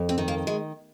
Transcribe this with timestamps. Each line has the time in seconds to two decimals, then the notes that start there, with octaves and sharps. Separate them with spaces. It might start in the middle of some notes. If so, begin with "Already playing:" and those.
Already playing: F2
0.09 C4
0.18 D#3
0.28 A#3
0.47 G#3